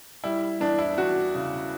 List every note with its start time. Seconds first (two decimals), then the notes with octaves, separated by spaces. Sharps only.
0.24 G3 E4
0.60 E2 D4
0.79 E4
0.97 E2 F#4
1.35 C#3